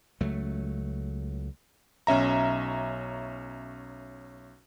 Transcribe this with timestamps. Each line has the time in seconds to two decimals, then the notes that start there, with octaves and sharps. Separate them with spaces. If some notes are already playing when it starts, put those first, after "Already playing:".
0.21 C#2 F#3 A3
2.07 B1 C#4 E5 A#5